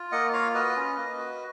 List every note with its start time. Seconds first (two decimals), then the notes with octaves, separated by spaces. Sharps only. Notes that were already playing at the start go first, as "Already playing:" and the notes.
Already playing: F4
0.12 A#3 D#5 F#5
0.33 F4 C#5 F5
0.54 F#4 B4 D#5
0.76 C#4
0.97 A#3
1.18 F#4